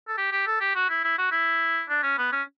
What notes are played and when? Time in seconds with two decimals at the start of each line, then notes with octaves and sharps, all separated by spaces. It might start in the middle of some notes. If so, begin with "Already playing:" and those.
0.08 A4
0.18 G4
0.32 G4
0.47 A4
0.61 G4
0.75 F#4
0.90 E4
1.04 E4
1.18 F#4
1.32 E4
1.89 D4
2.03 C#4
2.18 B3
2.32 C#4